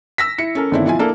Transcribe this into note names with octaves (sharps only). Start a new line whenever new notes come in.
E6 A#6 B6
E4 C#7
C#4 A4 A#4
G1 D#3 A3 C4 D4 E4
B1 F3 E4 F4 G#5
A#3 D4 E4 A4